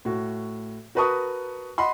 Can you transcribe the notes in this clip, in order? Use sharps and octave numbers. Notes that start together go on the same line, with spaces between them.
A2 F#4
F#4 A#4 B4 A5 C#6 D#6
D#5 F#5 B5 C6